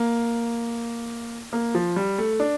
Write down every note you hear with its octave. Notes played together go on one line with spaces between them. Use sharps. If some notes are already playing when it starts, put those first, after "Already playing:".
Already playing: A#3
A#3
F3
G3
A3
D4